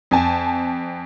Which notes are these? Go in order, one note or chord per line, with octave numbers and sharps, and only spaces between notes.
F2 G#5 A5